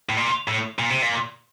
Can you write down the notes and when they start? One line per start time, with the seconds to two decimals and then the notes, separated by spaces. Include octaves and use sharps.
0.09 A2
0.17 A#2
0.48 A2
0.79 A#2
0.90 C3
1.02 A#2